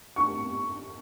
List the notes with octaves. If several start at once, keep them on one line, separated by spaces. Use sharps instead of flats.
C#6